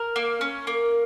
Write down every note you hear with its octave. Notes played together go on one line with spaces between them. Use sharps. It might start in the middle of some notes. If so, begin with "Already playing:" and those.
Already playing: A#4
A#3
C#4
A#3